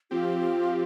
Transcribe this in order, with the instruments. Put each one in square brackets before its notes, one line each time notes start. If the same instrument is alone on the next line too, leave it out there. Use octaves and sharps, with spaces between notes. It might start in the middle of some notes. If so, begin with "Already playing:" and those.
[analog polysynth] F3 C4 G4 [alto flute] F4
[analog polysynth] F3 C4 G4